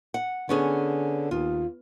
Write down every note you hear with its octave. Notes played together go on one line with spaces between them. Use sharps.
F#5
D3 B3 C#4 G#4
D#2 F4